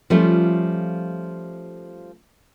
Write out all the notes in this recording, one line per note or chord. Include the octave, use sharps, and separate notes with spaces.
F3 G3 A3 C#4 F4